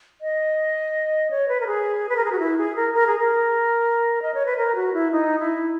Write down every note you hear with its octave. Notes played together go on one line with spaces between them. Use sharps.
D#5
C#5
B4
A#4
G#4
B4
A#4
G#4
F#4
E4
G#4
A#4
A#4
G#4
A#4
D#5
C#5
B4
A#4
F#4
E4
D#4
E4